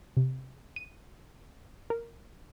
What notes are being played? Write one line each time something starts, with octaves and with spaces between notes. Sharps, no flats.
C3
D#7
A#4